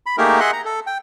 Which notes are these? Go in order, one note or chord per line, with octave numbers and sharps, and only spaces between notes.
B5
A3 A#3 D#4 G4 G#4 A#4
G#4 D#5 E5 F#5 C6 F#6
A#5
A4
G5